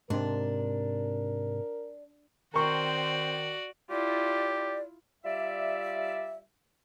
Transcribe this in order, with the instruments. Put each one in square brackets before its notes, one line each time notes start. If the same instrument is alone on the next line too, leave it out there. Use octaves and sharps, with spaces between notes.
[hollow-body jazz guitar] G#2 C3 [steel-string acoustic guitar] D4 [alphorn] A#4
[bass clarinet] D#3 [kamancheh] C4 C5 [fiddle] F#4 D5 [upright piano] A#4 C#6
[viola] E4 F4 [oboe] G4 [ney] D5
[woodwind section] G3 F4 D5 E5